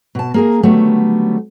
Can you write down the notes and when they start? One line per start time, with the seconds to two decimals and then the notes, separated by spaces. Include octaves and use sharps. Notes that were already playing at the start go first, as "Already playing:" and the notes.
0.15 B2 A5
0.34 A#3 G#4 A#4
0.63 D3 D#3 F#3 G3 A3 B3